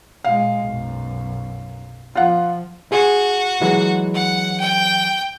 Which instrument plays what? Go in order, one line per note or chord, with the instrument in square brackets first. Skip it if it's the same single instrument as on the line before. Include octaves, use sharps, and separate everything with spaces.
[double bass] A#2 G#3 [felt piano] F5
[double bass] B1 F#2
[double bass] F3 [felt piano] F4 F#5
[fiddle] F#4 [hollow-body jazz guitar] G#4
[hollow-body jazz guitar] E3 F#3 G#3
[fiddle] F#5
G5